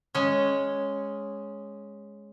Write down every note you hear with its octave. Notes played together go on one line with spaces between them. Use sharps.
G#3 C#4